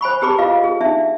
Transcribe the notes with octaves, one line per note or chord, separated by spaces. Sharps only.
C5 G#5 B5 C#6
G4 G#4 B4 A5 B5 D6
F4 B4 D#5 F5
G#4
D4 D#4 E5 A5